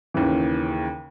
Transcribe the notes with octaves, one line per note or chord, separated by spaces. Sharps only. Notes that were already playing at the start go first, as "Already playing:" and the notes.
D#2 C#3 E3